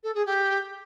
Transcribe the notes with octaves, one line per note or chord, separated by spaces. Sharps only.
A4
G#4
G4